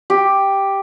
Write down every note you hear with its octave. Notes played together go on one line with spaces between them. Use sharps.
G4